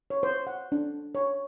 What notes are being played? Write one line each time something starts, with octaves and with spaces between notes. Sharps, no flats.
C#5
C5
F#5
D4
C#5